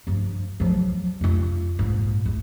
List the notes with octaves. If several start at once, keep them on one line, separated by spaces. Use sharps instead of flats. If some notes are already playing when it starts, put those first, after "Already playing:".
G2 F3
F3 F#3
F2 F4
A#1 G#2
E2